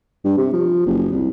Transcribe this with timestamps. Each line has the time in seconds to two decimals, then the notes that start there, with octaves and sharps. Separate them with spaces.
0.25 G2
0.38 C3
0.53 F3
0.86 F#1
1.12 C2